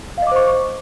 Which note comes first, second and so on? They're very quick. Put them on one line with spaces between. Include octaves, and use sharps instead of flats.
F5 D#5 D6 C5 C#6